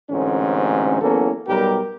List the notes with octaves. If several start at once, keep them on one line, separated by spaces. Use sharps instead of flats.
A1 D2 G#2 C4 C#4
E2 E3 F#3 A#3 C#4 A4
B1 G3 G4 A#4